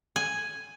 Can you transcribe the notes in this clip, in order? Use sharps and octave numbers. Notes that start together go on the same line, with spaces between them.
G#5